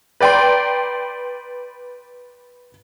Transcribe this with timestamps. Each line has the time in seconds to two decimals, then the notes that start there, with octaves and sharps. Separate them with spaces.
0.21 B4 D5 G5 A#5 C6